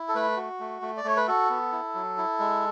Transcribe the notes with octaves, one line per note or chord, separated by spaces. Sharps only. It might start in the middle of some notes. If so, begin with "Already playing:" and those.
Already playing: E4
A4
A3 B4
F#4
A3
A3
D5
A3 C#5
B4
F#4 A4
B3
E4
F#3
E4
G#3